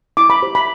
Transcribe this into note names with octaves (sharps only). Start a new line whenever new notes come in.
E4 D6
B5
G4 C5
B5